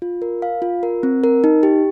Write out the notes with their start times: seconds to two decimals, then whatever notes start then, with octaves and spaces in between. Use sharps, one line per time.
0.02 F4
0.22 A#4
0.42 F5
0.62 F4
0.83 A#4
1.03 C4
1.24 A#4
1.44 D#4
1.63 G4